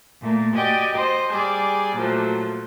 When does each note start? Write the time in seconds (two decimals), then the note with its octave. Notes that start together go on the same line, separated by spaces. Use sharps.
0.22 A#2 A3 A#3
0.54 F#4 G4 D5 D#5 G5 G#5
0.94 C5 D#5
1.30 G3 G#4 D5
1.97 A#2 F3 F#3 A3